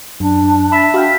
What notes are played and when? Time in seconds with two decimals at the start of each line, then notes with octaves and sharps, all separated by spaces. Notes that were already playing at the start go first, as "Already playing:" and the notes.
0.20 F#2 D4
0.72 E5 A5 B5
0.94 F#4 F5 G5